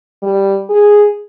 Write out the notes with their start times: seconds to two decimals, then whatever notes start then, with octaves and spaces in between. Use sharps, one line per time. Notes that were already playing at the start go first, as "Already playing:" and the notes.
0.23 G3
0.70 G#4